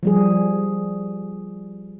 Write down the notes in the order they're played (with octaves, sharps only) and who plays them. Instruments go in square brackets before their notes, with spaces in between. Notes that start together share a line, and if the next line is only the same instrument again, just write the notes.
[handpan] F3 G3 G#4